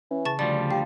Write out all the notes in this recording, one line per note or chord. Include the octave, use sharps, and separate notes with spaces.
E3 C#4
C#3 A5 C#6 A6
D2 F3 G3 D4 D5 A6
G4 F5